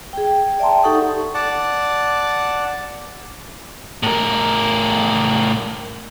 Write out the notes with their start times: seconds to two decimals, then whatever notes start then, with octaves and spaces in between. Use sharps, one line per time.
0.13 G#4 G5
0.60 D5 E5 G5 A5 A#5 C6
0.83 D#4 G4 A4 F#5 C#6 D#6
1.34 D5 F#5 A5
4.03 A2 A#4